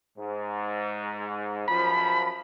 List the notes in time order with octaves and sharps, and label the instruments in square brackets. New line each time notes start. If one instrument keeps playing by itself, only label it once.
[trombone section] G#2
[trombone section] F#2 F3 [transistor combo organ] B5